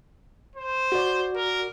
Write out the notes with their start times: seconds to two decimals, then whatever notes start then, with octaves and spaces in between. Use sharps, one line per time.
0.56 C5
0.92 F#4 D5
1.35 A#4